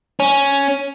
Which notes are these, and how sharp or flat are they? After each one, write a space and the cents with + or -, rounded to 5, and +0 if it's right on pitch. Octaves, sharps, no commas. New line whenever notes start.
C#4 +5